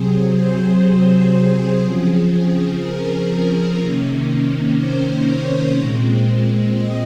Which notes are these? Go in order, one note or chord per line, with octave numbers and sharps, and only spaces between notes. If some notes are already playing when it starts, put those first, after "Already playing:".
Already playing: C3 F#3 C4 G#4
C5
G#4
C#3 F3 C4 G#4
G#4
A#4
A#4
C3 D#3 A#3 C#4
C5
C#5
A#2 G#3 C4
D#5